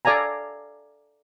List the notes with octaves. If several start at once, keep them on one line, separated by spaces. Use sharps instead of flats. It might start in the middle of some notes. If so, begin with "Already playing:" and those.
A4 D5 F5 G#5 A#5